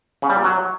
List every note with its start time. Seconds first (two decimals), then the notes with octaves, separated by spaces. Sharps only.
0.22 C#3
0.30 G3
0.37 A#2
0.44 F#3